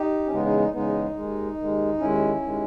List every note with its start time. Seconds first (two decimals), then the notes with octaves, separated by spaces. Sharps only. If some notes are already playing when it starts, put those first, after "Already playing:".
Already playing: D#4 G4
0.26 C#4
0.31 E2 C#3 G#3 B3 D#4
0.45 D#4
0.59 D#4
0.73 E2 C#3 G#3 B3 D#4
1.15 D#2 D#3 G#3
1.57 D#2 D#3 G#3
1.99 D#2 D#3 G#3 C#4 E4
2.42 D#2 D#3 G#3